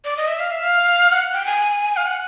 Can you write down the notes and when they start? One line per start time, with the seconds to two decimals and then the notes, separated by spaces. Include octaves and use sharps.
0.05 D5
0.17 D#5
0.28 E5
0.40 F5
0.52 E5
0.63 F5
1.10 F#5
1.33 G5
1.46 G#5
1.97 F5
2.06 F#5